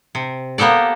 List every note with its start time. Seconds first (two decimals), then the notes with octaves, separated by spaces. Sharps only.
0.15 C3
0.58 A#3 B3 G4 A4 D5